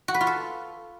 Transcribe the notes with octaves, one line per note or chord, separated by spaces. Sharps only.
F#4
B4
F4
A4